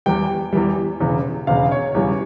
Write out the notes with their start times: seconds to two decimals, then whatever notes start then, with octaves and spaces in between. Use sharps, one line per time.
0.06 E2 E3 G3 G5
0.53 E2 E3 G3
1.00 E1 E2 C#3
1.47 E1 E2 C#3 F5
1.72 C#5
1.95 E2 C#3 E3 G3